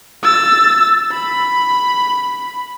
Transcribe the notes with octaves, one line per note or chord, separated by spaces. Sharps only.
E6 A6
B5